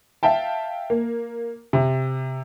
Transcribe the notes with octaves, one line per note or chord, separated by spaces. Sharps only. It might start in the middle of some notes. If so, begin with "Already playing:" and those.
E5 F5 G5 A5
A#3
C3